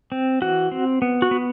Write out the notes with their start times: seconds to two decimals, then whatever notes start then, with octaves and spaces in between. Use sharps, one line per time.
0.12 C4
0.42 E3 F#4
0.72 C4
1.02 B3
1.22 F#4
1.31 B3